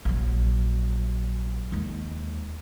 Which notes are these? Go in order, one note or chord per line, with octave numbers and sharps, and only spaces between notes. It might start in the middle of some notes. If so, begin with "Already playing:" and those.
A#1 F#3
D#2 G#3